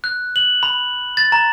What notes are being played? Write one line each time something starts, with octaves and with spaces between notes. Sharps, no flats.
F#6
F#7
B5
A6
A#5